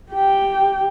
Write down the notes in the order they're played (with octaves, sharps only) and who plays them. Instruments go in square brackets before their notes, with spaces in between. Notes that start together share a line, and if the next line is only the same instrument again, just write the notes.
[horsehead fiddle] G4 G5